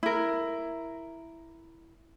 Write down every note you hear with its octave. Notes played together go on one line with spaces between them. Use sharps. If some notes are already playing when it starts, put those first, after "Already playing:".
E4 A#4